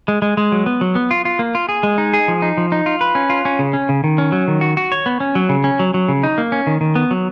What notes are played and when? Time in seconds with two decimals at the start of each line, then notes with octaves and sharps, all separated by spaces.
0.08 G#3
0.22 G#3
0.37 G#3
0.52 F#3
0.66 B3
0.81 F#3
0.95 B3
1.11 F4
1.25 F4
1.39 A#3
1.55 F4
1.69 G#4
1.83 G#3
1.98 D#4
2.14 G#4
2.28 F3
2.42 D#4
2.57 F3
2.72 D#4
2.86 F4
3.01 B4
3.15 C#4
3.30 F4
3.45 C#4
3.59 C#3
3.73 C#4
3.89 C#3
4.04 D#3
4.18 C#4
4.32 F#3
4.48 D#3
4.61 F#4
4.77 F#4
4.92 C#5
5.06 B3
5.20 C#4
5.35 F#3
5.49 C#3
5.64 C#4
5.79 F#3
5.94 F#3
6.08 C#3
6.23 D#4
6.38 A#3
6.52 C#4
6.67 D#3
6.81 D#3
6.95 B3
7.11 F#3